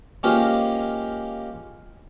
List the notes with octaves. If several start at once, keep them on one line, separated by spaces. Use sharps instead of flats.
G#3 A#3 C#4 F4 G4 C5